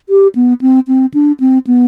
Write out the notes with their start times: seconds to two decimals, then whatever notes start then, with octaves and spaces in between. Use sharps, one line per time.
0.09 G4
0.35 B3
0.61 C4
0.88 C4
1.14 D4
1.40 C4
1.67 B3